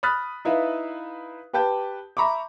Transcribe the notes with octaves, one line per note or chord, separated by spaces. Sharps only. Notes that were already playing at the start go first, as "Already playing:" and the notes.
B5 D#6 F6 F#6 A6 B6
D#4 E4 B4 E5 F5
G4 B4 G5 A5 G6
E5 A#5 B5 C#6 D6